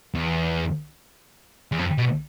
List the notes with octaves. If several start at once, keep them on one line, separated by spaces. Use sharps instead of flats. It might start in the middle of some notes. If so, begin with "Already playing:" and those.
E2
E2
F2
B2